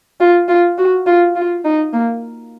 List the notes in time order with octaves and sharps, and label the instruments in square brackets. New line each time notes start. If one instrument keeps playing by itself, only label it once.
[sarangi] F4
F4
F#4
F4
F4
D#4
A#3